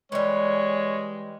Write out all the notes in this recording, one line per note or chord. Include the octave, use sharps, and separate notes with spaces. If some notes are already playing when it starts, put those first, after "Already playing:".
E3 G3 G#3 C#5